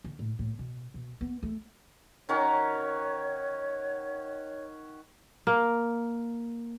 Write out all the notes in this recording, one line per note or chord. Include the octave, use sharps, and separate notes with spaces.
D3
A2
A2
B2
B2
B3
A3
D#3 C#4 F#4 C#5
A#3